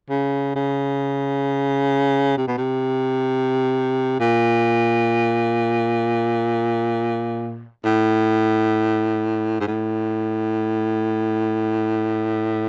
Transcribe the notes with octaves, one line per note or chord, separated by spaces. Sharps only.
C#3
C#3
C3
B2
C3
A#2
A2
G#2
A2